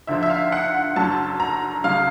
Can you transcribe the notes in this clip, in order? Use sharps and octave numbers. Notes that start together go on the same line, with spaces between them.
D2 D3 F3 E5
E5
F5
F#5
F#1 F#2 D3 F#3 A5
A#5
D2 C#3 F#3 F5